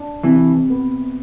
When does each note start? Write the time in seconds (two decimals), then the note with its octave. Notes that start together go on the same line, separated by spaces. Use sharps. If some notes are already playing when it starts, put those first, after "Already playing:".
Already playing: D4
0.23 C3 E3
0.70 B3